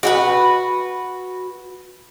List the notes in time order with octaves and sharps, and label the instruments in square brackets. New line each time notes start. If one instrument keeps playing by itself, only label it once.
[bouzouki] F#4 G4 B4